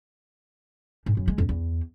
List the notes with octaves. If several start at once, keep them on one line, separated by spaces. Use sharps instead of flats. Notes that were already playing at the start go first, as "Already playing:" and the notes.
G#2
F#2
G#3
F2
E2